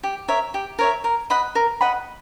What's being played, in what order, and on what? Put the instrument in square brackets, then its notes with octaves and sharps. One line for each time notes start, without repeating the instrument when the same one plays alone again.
[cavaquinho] G4
A#4 C#5 E5
G4
A#4 C#5 E5
A#4
D#5 F#5 B5
A#4
D#5 F#5 B5